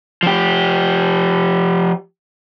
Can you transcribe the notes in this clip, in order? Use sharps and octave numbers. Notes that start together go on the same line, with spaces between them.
F3 G4